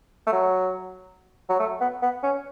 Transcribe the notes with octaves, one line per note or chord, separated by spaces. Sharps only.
A3
F#3
F#3
A3
B3
B3
C#4